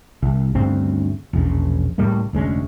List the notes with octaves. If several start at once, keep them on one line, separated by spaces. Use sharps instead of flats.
C2
D2 G2 C#3 C4
E1 A#1 A2 C#3
C#2 A2 G3 A#3
F1 D2 G#3 C#4